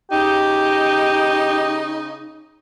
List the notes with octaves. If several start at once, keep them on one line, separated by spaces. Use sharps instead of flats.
C#3 D#4 G4